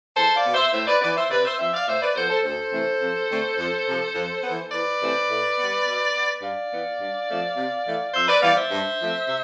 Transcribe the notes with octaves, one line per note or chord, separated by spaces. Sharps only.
E2 A4 C5
D5 F5
B2 B3
C5 E5
A2 C5 E5
B4 D5
E3 B3 B4 D5
D5
C5 E5
C3 B4 D5
C5 E5
F3 C4 C5 E5
D5 F5
A2 C5 E5
B4 D5
F3 B3 A4 C5
A4 C5
D2 A4 C5
C3 E3 A3 C4
F2
D3 A3 C4
F2
C3 F3
F2
E3 B3
E2 B4 D5
C3 E3 A3 C4
A2
G3 B3
B2
B3
G2 D5 F5
E3 B3
G2
F3 A3 C4
C3
E3 A3
F2 C5 E5
B4 D5
E3 G3 B3 D5 F5
C5 E5
G2
F3 A3 C4
C3